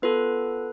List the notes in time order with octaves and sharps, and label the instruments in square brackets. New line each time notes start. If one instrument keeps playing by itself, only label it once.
[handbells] B3 F4 A4 B4